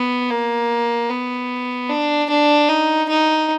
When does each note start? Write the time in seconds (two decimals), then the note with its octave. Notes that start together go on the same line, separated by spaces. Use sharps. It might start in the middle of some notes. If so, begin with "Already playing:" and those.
Already playing: B3
0.31 A#3
1.10 B3
1.90 D4
2.29 D4
2.68 D#4
3.08 D#4